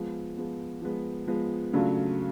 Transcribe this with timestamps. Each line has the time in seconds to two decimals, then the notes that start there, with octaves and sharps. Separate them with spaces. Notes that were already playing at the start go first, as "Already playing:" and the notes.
Already playing: F3 G#3 B3
0.37 F3 G#3 B3
0.82 F3 G#3 B3
1.27 F3 G#3 B3
1.73 C#3 F#3 A3 D4 F4